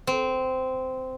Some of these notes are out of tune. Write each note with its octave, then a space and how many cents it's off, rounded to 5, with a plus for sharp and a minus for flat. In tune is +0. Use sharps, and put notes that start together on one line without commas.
C4 -15